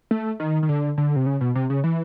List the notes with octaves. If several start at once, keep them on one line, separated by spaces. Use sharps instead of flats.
A3
D#3
D#3
D3
D3
C3
C#3
B2
C3
C#3
E3